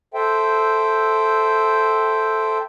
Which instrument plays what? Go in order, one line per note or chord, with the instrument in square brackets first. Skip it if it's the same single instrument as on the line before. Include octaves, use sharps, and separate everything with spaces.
[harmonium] A4 C5 E5 G5